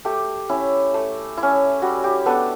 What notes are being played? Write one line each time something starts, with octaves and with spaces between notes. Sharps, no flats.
A3 G4
C#4 E4
A3
E4
C#4
G3 F#4
G4
B3 D4 A4